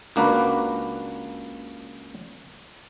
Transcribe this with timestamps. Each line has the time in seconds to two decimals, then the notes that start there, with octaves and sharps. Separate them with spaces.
0.16 C#2 A#3 D4 F#4 B4